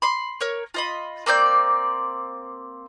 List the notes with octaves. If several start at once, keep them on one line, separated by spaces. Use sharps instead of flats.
B5 C6
A#4 C#5
F4 D#5 B5
A#3 C4 D5 G6